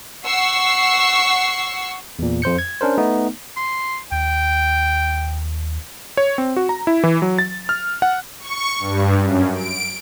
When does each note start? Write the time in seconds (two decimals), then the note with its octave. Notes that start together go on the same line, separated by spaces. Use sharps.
0.25 F#5 C#6 E6 C7
2.19 E2 A#2
2.42 F2 C5 G6 C#7
2.59 G#6
2.81 C#4 D4 A#4 C5
2.98 A3 B3 D#4
3.57 C6
4.12 D#2 G5
6.17 C#5
6.38 C4
6.56 F#4
6.69 A#5
6.87 E4
7.03 E3
7.22 F#3
7.39 A6
7.69 F6
8.02 F#5
8.40 C#6
8.79 G2
9.19 F#2
9.54 D7